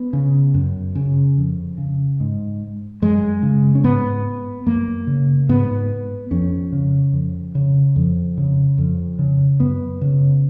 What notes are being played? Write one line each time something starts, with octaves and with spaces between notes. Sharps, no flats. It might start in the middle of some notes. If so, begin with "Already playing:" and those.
Already playing: B3
C#3
F#2
C#3
F2
C#3
G#2
F#2 G#3
C#3
C#4
G#2 B3
F#2 A#3
C#3
G#2 B3
F2 C#4
C#3
F2
C#3
F2
C#3
F2
C#3
F#2 B3
C#3